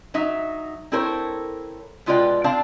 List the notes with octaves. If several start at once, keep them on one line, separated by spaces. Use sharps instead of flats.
F#3 D#4 E5
C4 E4 A4 A#4 C5 C#5
B2 G#3 F4 B4 D5 G5
C4 D4 D5 F5 A5